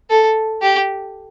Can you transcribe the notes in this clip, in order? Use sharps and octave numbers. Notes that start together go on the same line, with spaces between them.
A4
G4